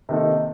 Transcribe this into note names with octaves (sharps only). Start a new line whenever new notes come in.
C3 D#3 A#3 D#4 A4